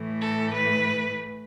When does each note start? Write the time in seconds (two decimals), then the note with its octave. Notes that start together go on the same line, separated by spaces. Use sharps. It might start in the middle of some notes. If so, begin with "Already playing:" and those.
Already playing: A2 E3 A3
0.21 A4
0.54 B4